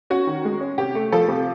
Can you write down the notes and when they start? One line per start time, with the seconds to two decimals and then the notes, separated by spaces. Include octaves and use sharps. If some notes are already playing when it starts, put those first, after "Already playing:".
0.10 C#4 F#4
0.27 D#3
0.45 G#3
0.61 C#4
0.78 C3 G4
0.95 A3
1.12 F3 A4
1.28 C3